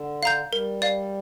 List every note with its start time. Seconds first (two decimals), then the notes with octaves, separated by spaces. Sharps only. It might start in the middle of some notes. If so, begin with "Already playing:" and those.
Already playing: D3
0.23 F5 A#5 G6
0.53 G3 A#4
0.82 D5 F5